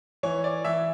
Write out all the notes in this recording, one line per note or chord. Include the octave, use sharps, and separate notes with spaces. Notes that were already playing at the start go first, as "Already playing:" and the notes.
E3 C#5
D5
E3 E5